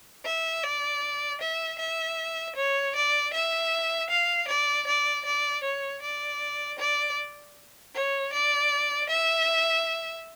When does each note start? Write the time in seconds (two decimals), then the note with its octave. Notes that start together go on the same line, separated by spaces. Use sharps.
0.25 E5
0.63 D5
1.41 E5
1.79 E5
2.56 C#5
2.95 D5
3.33 E5
4.10 F5
4.48 D5
4.87 D5
5.25 D5
5.64 C#5
6.02 D5
6.79 D5
7.94 C#5
8.33 D5
9.10 E5